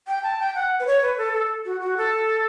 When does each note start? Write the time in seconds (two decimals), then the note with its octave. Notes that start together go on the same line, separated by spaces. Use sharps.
0.07 G5
0.23 A5
0.39 G5
0.55 F#5
0.80 B4
0.86 C#5
1.02 B4
1.18 A4
1.33 A4
1.65 F#4
1.81 F#4
1.97 A4